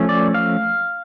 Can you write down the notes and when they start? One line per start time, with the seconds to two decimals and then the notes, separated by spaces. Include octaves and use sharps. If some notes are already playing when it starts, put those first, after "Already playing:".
Already playing: F3 A3 C#4
0.09 D5
0.34 F5